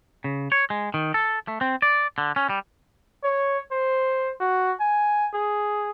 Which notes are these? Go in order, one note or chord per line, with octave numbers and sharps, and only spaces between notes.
C#3
C#5
G#3
D#3
A4
A3
C4
D5
D3
C#4
G3
C#5
C5
F#4
G#5
G#4